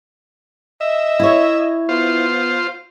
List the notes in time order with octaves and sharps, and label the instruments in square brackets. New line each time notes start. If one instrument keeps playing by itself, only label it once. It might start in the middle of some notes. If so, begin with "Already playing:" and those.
[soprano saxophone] D#5 [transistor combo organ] E5
[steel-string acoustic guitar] E4 C#5
[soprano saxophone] B3 [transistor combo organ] F4 C5